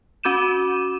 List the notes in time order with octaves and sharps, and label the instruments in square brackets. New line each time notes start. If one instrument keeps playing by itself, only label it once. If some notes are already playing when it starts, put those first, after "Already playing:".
[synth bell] C#4 F#4 D6 G6 D#7 E7